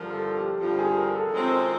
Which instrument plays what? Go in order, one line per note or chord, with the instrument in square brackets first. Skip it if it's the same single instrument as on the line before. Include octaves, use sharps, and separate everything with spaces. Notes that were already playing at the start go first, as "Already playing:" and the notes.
Already playing: [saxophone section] G2 D3 F3 [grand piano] A#4
[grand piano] A4
G4
[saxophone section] G2 D3 F3 [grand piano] G4
[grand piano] G#4
A#4
A4
[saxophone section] F#2 D#3 G#3 C4 F4